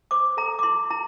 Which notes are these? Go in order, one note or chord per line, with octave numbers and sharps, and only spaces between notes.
C5 D6
A4 A#5
D6
E4 C6
E4 A#5